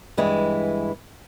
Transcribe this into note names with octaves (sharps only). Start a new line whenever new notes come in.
G2 E3 G#3 E4